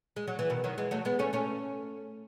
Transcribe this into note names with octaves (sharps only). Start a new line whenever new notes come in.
G#3
F#3
E3
B2 D#3
D#3 F#3
E3 G#3
F#3 A3
G#3 B3
A3 C#4
A3 C#4